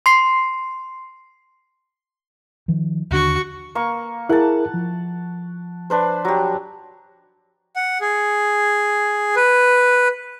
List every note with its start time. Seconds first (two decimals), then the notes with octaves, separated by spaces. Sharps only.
0.06 C6 C7
2.68 D#3 F3
3.11 D#2 D3 D4 F#4 C#6
3.75 A#3 C#6
4.29 E4 G#4 A#4 F#5 A5
4.74 F3
5.90 D4 B4 C5
6.25 F#3 G4
7.76 F#5
8.01 G#4
9.36 B4